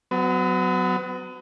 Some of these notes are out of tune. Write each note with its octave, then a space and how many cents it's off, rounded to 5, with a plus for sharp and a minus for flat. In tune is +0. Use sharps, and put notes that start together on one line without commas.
F#3 +0 B3 +40